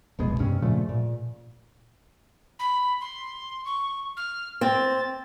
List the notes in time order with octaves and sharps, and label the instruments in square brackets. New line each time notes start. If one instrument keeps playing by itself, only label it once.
[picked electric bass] F1 C2 B2 G#3
G2 C3 C#4
A#2 C#3 F3 A3
A#2
[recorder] B5
C6
C#6
F6
[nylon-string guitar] C4 [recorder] A6